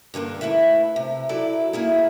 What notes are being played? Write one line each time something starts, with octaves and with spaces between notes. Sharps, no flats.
G2 D3 A#3 A#4
A3 E4 B4 E5
C3
F#3 E4 A4 D5
A#3 E4 G#4